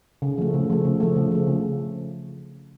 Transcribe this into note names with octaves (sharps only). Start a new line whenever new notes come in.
C#3
F3 A3
C#3
F3 A3
C#3
F3 A3
C#3
F3 A3
C#3